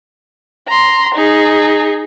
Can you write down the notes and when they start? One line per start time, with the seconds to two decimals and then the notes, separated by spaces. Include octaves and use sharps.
0.68 A#5 C6
1.15 D#4 G#4